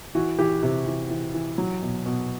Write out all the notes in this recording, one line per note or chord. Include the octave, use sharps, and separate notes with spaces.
E3 F#4
E3 G4
C3 G4
E3
E3
E3
F#3
B2
B2